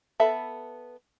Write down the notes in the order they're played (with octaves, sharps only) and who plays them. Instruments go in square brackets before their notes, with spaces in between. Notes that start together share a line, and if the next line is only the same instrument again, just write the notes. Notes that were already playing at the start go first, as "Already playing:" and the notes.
[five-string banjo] B3 A4 E5 A5 B5